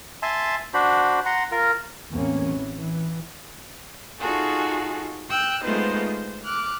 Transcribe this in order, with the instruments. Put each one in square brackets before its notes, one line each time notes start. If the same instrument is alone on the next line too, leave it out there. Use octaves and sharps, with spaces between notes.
[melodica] E5 G#5 A5 C6
D4 F#4 C5 B5
F#5 A#5 C6
F4 A#4
[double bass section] A1 E2 A#3 C4 C#4
E3
E3
[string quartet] D#4 F4 F#4 G#4 A4
G5 E6 F#6 G6
G#3 A3 B3 D#4 F4 C5
C5
D6 F6 F#6